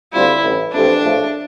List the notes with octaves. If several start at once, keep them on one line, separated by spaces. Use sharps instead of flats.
D2 D3 G3 C4 E4 F4
A1 G2 E3
F2 E3 A3 C4 D4 G4
A#1 A2 F3 A3